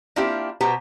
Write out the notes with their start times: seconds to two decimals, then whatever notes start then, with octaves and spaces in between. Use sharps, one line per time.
0.16 A#3 C4 D4 E4 F4 G4
0.61 B2 B3 G4 C5 A#5